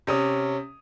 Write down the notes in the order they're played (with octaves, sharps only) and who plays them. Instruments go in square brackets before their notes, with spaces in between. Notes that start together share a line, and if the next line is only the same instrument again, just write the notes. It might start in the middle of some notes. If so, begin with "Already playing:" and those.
[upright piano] C3 C#4 D#6